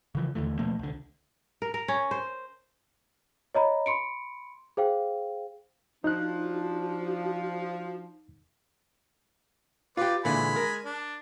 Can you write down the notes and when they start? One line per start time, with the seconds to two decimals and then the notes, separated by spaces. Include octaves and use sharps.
0.15 C#3 E3 F3
0.35 D#2 D3 E3 A3
0.59 B2 F3 A3 A#3
0.79 C2 D3
1.62 A#4
1.74 A#4
1.88 C#4
2.11 C5
3.55 C#5 D#5 A#5 B5
3.86 B5 C6 C#7 D7
4.77 G#4 C5 F5 G5
6.04 F3 D4 D#4 F#4 F#6
9.97 F4 G4 B4 D5
10.25 A#2 D3 E3 G#3 G#5 B5
10.56 A#4
10.85 D4